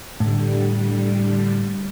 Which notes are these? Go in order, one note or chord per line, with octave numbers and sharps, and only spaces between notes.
A2 D3 G3